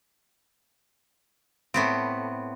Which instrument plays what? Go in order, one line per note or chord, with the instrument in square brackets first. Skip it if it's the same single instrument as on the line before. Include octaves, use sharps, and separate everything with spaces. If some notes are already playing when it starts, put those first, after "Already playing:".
[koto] A2 B3 C4